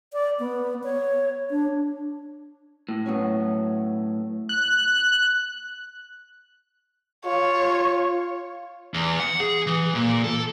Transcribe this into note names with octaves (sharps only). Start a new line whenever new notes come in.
D5
B3
C#5
D4
A2
B2 F#3 C#4
F#6
F4 C#5
E2
F#5
G#4
E3
A#2
A4